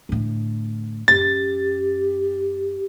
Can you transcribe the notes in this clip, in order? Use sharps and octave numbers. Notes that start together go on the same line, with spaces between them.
A2 D3
F#2 C#4 G4 A6